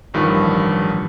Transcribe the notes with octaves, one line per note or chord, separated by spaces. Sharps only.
A1 G2 D#3 F3